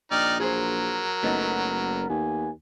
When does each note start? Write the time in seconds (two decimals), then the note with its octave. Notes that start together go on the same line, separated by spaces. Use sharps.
0.11 A#1 D#4 D5 G5 F6
0.40 F#3 G#4 A#4 C5
1.23 F#1 A3 B3 D#4
2.10 D#2 G#5